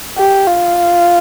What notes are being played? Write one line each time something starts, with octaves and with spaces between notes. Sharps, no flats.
G4
F4